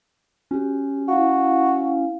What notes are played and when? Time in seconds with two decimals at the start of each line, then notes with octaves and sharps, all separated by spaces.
0.51 C#4 F#4 G4
1.08 E4 F#4 F5